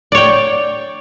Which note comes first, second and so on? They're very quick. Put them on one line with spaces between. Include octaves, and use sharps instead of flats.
D5 C#5 G5